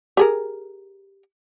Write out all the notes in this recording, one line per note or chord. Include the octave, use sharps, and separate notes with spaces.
G4 G#4 A#4